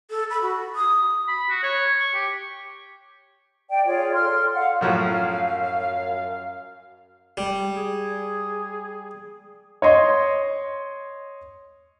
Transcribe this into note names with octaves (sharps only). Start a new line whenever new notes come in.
A4
B5
F#4
D#6
B5
F#4
C#5
C#6
G4
D5 G5
F4 G#4 C#5 D5
A4 C6 F6
F5 F#5
F#2 A2 F3 F#3 F5
G3
G#4
C#5 D#5 C6